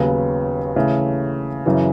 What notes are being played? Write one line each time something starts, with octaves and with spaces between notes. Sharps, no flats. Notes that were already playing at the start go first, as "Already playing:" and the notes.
Already playing: D#2 C#3 F#3 B3
C#3 E3 A3
F#2 C#3 E3